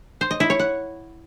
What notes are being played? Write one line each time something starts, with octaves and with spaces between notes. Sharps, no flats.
C5
D#5
E4
C#5
F#5